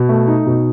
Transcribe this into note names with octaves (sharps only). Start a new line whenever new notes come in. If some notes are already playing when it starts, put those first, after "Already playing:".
Already playing: B2
A3
D#4
B2